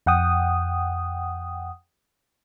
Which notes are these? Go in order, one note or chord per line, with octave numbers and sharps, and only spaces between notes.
F2 F#5 G5 D#6